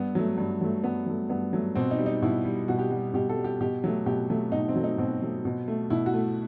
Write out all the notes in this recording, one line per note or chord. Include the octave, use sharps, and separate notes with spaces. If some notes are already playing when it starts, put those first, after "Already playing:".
Already playing: G2 B3
F#3 A3
G2
F#3 A3
G2 B3
F#3 A3
G2 B3
F#3 A3
B2 C4
D#4
G3
D#4
B2 E4
G3
B2 F#4
G4
G3 F#4
B2 G4
A4
G3
G4
B2 G4
F#3 A3
B2 G4
F#3 A3
B2 D#4
C4
F#3 A3
D#4
B2 C4
F#3 A3
B2
A3
B2 E4
F#4
A3